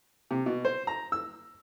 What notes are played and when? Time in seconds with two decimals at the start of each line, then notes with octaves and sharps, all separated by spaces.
0.31 C3
0.46 B2
0.65 C5
0.87 A#5
1.12 E6